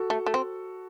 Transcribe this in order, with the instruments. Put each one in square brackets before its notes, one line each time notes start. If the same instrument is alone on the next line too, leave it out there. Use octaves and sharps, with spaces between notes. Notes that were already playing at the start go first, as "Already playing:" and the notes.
Already playing: [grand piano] F#4 A4
[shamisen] A3
A3
C4